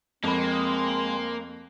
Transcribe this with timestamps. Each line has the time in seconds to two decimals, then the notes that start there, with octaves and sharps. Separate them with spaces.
0.23 F2 G#3 A#3 C4 B5